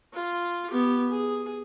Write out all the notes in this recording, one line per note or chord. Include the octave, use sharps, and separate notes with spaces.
F4
B3 G4
G#4